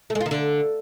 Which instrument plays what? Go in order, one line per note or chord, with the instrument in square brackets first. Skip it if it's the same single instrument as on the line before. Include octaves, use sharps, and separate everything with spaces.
[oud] A3
G#3
F4
D#3
D3